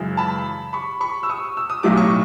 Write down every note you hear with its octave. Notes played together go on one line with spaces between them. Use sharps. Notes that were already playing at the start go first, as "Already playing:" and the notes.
Already playing: F#2 C#3 E3 G#3
A5 B5
B5 C#6
B5 C#6
E6
C#6 D#6
E6
D#6
B1 A2 F#3 A3 D6
C#6 D#6